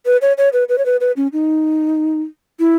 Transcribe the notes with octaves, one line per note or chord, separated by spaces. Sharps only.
B4
C#5
C#5
B4
B4
C#5
B4
B4
C#4
D#4
E4